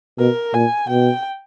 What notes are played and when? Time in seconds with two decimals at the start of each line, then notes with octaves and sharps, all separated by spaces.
0.19 B2 A#4
0.54 A#2 G#5
0.89 B2 G5